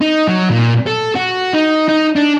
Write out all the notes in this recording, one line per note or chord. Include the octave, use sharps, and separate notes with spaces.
D#4
F#3
A#2
A4
F#4
D#4
D#4
D4